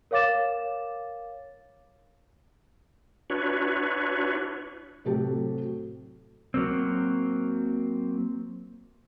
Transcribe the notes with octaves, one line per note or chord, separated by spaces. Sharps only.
A#4 C#5 F5 D6 A6 E7
D4 E4 F#4 B4 C#5
A2 C3 F#3 F#4 G4 A4
F#3 A#3 C4